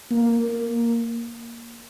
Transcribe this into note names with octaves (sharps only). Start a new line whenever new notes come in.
A#3